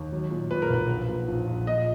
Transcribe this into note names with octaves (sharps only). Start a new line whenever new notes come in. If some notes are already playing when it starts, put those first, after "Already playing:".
Already playing: D#2
F#3
A#2
A#2 B4
A#4
B1 B4
A#1
A#2
A#1
A#1
A#2 D#5